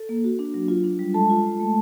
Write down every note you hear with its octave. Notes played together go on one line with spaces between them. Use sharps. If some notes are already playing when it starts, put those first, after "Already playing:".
Already playing: A4
A#3
F#4
D4
F#3
F4
D4
G3
G#3 A4 A5
F4
G#3
A3